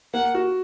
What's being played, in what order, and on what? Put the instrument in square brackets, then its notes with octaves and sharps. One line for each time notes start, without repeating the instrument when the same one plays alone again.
[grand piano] A#3 [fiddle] F#5
[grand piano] F#4